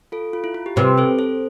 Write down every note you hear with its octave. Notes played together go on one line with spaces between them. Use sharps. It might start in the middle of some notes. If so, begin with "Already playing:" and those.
F4 A4
F4
E4
F4
G4
C3 G4 B4
A4 C5
A4 C5